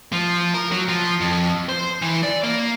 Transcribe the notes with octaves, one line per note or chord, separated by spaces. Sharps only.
F3
A#4
F#3
F3
F2
C5
E3
D5
A#3